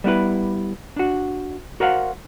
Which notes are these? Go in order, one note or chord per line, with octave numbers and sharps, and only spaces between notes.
G3 B3 E4 B4
D4 F#4
F#4 A#4 C5 D5 F5 F#5